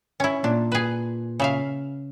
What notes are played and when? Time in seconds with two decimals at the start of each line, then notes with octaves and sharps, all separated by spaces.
0.20 C#4 E4
0.44 A#2 D4
0.72 G#4 B4
1.40 C#3 E5 F5